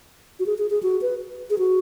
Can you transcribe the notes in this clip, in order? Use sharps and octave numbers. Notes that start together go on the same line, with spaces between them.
F#4
G#4
G#4
G#4
F#4
B4
G#4
F#4